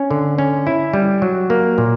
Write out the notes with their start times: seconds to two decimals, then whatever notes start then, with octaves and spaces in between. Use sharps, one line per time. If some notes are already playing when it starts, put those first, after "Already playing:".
Already playing: C#4
0.11 D3
0.38 C#4
0.67 E4
0.94 G3
1.22 F#3
1.50 A#3
1.78 A#2